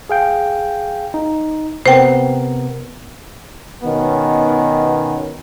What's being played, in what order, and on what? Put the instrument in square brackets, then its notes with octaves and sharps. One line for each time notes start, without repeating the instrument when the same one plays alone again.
[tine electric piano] G#4 F5 G5
D#4
[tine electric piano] C3 B3 A#4 [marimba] C5 G5
[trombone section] B2 D#3 B3 C#4